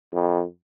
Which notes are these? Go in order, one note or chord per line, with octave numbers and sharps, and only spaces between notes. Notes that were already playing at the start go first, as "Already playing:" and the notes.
F2